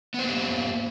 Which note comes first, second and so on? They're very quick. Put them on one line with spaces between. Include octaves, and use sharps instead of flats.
B3 C5 A#3 G4